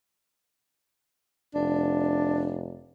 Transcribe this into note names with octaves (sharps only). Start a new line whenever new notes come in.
F1 D4